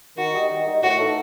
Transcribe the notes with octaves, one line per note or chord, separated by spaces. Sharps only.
D#3 F#4
G3 D#4 G4 D#5
D#3
G3 D#4 G4 D#5
A2 F#4
E3 A3 D#4 A4